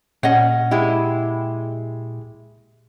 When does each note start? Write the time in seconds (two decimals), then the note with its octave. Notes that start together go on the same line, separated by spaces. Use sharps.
0.23 A#2 C#4 D#5 F#5
0.71 G#3 E4 G4